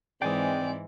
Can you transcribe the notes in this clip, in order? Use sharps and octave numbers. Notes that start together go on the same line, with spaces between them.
G#2 E3 G#3 C4 D5 G5 G#5 D#6